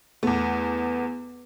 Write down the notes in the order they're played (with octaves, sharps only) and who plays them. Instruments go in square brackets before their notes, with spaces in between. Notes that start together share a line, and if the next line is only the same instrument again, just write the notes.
[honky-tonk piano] E2 A3 [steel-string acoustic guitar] B3